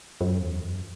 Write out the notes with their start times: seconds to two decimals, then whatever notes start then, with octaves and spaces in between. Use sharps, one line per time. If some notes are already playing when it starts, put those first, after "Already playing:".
0.21 F#2
0.41 E2
0.63 F#2